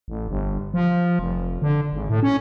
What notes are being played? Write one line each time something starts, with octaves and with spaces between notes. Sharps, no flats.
A1
G1
F3
F1
D3
G#1
A2
C#4